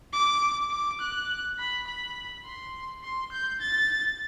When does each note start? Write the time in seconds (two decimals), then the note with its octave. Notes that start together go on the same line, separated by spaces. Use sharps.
0.13 D6
0.71 D6
1.01 F#6
1.59 B5
1.87 B5
2.45 C6
3.04 C6
3.32 G6
3.61 A6